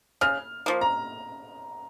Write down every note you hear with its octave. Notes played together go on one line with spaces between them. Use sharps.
C#3 F6
F3 A#3
A#5